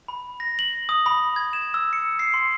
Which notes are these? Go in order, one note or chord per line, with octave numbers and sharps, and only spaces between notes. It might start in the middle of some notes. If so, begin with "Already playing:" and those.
B5
A#6
F#7
D#6
B5
G#6
E7
E6
C#7
C7
C6